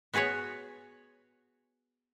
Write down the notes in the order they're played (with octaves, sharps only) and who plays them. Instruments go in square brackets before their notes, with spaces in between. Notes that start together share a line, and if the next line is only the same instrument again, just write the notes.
[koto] B3 F#4 G#4 B4 C#5